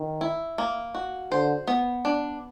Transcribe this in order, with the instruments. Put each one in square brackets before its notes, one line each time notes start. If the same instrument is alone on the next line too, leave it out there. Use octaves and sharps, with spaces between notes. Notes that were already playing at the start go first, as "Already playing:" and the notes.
Already playing: [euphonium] D#3
[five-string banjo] E4
A#3
F#4
[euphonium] D3 [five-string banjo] C5
[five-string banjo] B3
D4